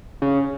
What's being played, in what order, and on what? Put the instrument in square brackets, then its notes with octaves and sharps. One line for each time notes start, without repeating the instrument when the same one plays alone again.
[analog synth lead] C#3